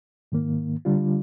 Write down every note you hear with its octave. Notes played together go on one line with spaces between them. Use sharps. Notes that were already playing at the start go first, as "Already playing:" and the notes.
G#2 D#3 A#3
D3 G3 D4 F4